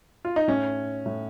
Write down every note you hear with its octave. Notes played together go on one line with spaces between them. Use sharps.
F4
D#4
A2 C#4
A2